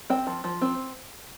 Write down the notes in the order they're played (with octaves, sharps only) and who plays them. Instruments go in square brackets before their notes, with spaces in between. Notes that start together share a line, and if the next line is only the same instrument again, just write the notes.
[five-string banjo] C4 G5
F3
F3
C4